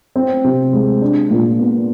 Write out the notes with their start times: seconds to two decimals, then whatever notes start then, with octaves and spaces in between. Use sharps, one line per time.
0.16 C4
0.44 C3
0.73 G#3
1.02 D4
1.31 A#2
1.59 B3